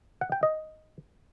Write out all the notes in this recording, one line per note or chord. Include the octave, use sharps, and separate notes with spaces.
F#5
G5
D#5